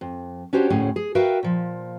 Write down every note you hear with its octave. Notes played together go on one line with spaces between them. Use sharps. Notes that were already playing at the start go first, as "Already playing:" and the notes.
F2
C#4 D4 F#4 G4 C5 C#5
D2 A2 C#4 G#4
G#4
F#4 A#4 B4 E5 F5 G5
A#2 F3